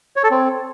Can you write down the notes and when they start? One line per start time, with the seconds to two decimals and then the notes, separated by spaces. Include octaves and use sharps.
0.16 C#5
0.24 A4
0.31 C4